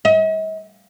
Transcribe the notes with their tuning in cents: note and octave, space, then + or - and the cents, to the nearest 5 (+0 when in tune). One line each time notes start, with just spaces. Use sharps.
D#5 +45